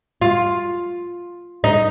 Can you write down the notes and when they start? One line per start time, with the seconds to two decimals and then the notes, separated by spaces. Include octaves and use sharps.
0.22 F4
1.64 D#4